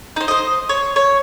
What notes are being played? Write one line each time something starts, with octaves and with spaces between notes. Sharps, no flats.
D#4 C5
C5 D#5
C#5
C#5